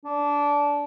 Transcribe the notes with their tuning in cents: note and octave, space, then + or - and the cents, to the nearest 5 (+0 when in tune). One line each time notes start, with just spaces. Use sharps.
D4 -20